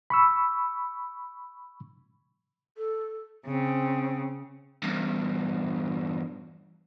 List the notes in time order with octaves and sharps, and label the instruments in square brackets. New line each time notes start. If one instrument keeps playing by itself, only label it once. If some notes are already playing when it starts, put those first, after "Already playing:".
[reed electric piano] B5 C#6 E6
[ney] A4
[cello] C#3 [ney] C4
[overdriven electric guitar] E2 G2